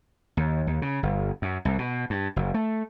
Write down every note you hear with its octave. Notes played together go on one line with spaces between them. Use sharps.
D#2
D#2
C#3
G1
F#2
C2
B2
G2
F#1
A3